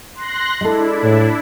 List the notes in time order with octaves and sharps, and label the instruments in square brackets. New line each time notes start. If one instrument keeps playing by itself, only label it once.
[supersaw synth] C6 F#6 A#6
[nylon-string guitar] G#3 A4 [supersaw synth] D4 E4
[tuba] A2